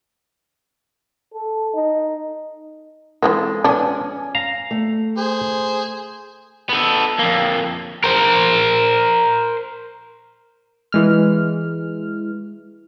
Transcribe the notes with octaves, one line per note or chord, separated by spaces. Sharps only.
A4
D#4
E3 F3 G#3 C4 A4
F3 B3 C#4 D4 G#5
F5 A#5
A3
G#4 C5
B3 A4
F2 A#3
A#4 C5
E3 G#3 F6